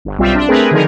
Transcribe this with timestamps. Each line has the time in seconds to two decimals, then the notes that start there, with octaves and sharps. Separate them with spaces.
0.05 G1
0.18 B1 G3 C4 F4 E5
0.35 D4
0.48 A3 C4 G#4 A#4 B4
0.71 D3 D#3 F3 D#4 G#4 A#4